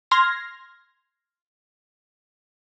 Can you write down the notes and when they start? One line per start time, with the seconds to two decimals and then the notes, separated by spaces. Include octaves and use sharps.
0.11 C6 F6 G#6 A#6